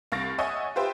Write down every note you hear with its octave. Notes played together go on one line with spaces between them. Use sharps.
C2 F5 C#6 A6 A#6 D7
C#5 D#5 E5 F#5 G#5 C#6
F4 G4 B4 C5 E5 G5